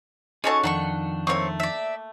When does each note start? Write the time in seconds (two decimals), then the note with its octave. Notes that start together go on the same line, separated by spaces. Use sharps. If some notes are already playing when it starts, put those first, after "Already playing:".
0.44 C#4 D#4 F#4 G#4 A4 C#5 A5
0.64 F2 D#3 D4 F#5 A#5 C#6
1.27 A3 A#3 C4 C#5 C#6
1.60 D5 E5